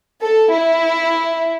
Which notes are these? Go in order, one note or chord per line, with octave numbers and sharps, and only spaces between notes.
A4
E4